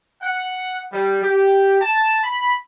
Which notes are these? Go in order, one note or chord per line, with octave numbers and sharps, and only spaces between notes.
F#5
G3
G4
A5
B5